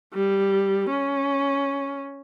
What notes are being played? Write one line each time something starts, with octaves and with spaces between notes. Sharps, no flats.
G3
C#4